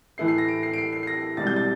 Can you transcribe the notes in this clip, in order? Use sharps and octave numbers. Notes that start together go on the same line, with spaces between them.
A2 E3 A3 E4 C7
C7
A#6
D7
C7
D7
C7
C7
C7
A#6
E1 E2 C3 G3 A6
G6
A6